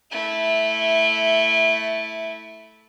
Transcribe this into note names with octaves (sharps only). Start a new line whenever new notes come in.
A3 E4